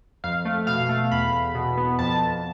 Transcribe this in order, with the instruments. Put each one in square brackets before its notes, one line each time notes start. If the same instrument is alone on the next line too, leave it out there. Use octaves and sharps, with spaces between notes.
[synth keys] F2 F5
A3
B2 F5
A3
E2 B5
E2
B2
B3
F2 A5
F2